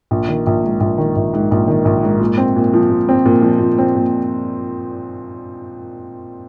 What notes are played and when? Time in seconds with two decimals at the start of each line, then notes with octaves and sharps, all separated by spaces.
0.11 A#1
0.28 D#3
0.47 A#1
0.64 G#2
0.80 A#1
0.98 D#3
1.16 A#1
1.33 G#2
1.51 A#1
1.68 D#3
1.85 A#1
2.03 G#2
2.20 A#2
2.38 C4
2.56 A#2
2.74 F3
2.90 A#2
3.09 C4
3.26 A#2
3.42 F3
3.60 A#2
3.78 C4
3.96 A#2